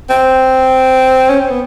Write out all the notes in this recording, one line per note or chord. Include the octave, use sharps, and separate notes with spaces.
C4
C#4
C4
B3